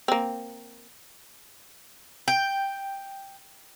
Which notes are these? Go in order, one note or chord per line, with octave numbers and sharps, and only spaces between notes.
A#3 C4
G5